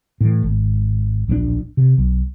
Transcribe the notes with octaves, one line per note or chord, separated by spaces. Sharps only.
A2 E3
G#1
D1 A#1 G#2 D4
C3
B1